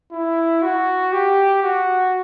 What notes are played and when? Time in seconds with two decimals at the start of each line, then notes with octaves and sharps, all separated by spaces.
0.12 E4
0.62 F#4
1.12 G4
1.63 F#4